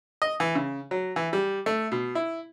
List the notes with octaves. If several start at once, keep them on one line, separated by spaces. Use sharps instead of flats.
D#5
E3
C#3
F#3
E3
G3
A3
B2
E4